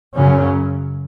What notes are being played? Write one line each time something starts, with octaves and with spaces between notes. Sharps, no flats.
F#2 C#3 F#3 C#4